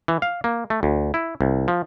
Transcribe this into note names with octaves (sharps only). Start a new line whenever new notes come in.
E3
F5
A#3
A3
D2
E4
C2
F3